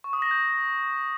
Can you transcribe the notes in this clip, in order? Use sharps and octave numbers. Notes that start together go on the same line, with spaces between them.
C#6
D#6
A#6
G6